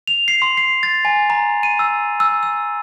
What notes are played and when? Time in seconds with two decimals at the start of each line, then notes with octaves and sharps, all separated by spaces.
0.07 F7
0.28 C7
0.42 C6
0.57 C7
0.83 A6
1.05 G#5
1.30 A#5
1.63 D#7
1.79 E6
2.20 E6
2.43 E6